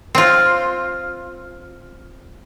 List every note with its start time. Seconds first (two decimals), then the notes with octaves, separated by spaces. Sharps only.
0.15 C4 F4